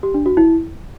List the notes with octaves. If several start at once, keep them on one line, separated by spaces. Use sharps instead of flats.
G4
D4
F#4
E4